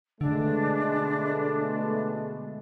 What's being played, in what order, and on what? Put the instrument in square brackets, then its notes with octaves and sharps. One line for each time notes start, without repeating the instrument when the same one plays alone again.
[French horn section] B2 G#3 A3 [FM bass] D3 [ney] D4